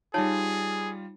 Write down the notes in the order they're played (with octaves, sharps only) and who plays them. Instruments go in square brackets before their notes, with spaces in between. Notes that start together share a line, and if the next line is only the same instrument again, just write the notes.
[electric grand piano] G3 F4 [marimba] D#4 [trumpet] G#4 [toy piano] C#5 A5